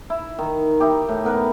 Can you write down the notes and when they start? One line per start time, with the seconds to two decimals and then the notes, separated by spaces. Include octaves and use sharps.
0.10 E4
0.39 D#3
0.80 D#4 E4 G4
1.09 A2
1.25 B3 A#4 B4